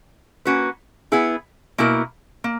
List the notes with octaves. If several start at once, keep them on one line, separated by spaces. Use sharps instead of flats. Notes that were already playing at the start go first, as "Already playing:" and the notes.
A#3 C#4 F#4 B4
B3 E4 G#4
B2 A#3 E4 A#4
A#3